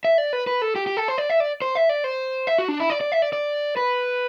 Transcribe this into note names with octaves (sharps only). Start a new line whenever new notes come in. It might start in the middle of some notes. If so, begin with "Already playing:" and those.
E5
D5
B4
B4
A4
G4
G4
A4
C5
D5
E5
D5
C5
E5
D5
C5
E5
F#4
D4
E4
D5
D5
E5
D5
D5
B4